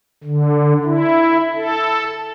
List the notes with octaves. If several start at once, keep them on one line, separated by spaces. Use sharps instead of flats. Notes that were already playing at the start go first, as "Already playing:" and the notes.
D3
E4
A4